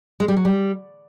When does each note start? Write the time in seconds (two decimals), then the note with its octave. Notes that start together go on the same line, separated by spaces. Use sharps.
0.20 G#3
0.28 G3
0.37 F#3
0.45 G3